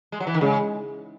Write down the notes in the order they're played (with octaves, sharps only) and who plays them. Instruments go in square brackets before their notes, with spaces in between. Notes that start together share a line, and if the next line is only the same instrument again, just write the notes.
[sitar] G#3
F#3
E3
D#3
[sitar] C#3 [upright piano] G#3